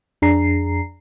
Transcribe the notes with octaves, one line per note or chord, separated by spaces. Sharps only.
F2 D4 G#4 A#5 C7